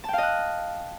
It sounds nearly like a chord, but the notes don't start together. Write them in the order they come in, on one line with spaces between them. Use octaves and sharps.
A5 G5 F5 D#5 F#6